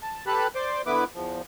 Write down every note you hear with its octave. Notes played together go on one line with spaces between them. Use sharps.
A5
G4 A4 B4 A5 B5 F#6
C5 D5 C6 D6
D3 B3 E4 B4 D6
E2 F3